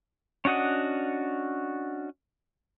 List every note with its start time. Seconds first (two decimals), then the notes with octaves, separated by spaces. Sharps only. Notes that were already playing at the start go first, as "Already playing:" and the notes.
0.45 C#4 D4 F#4 D#5 F#5